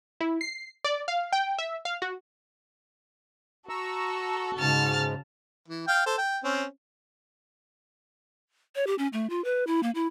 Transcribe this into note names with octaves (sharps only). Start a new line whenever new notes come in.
E4
C7
D5
F5
G5
E5
F5
F#4
F#4 A4 A#5 C#6 E6
G#2 C#3 A5 F6
E3
F5 G5
A4 C5
G5
C4 C#4
C#5
G4
C#4
A3
F4
B4
E4
A#3
E4